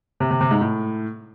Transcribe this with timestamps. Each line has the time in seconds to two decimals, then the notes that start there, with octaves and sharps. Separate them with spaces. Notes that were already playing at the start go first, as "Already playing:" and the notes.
0.20 C3
0.31 C3
0.41 C3
0.51 G#2
0.61 A2